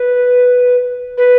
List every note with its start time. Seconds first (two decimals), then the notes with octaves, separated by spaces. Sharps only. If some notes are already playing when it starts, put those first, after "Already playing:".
Already playing: B4
1.18 B4